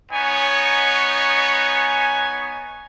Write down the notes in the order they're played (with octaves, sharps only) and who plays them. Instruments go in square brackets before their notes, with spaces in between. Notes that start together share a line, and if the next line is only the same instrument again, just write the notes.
[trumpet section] B3 D#4 C#5 [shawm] G#5